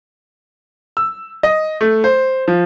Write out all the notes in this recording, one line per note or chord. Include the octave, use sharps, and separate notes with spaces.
E6
D#5
A3
C5
F3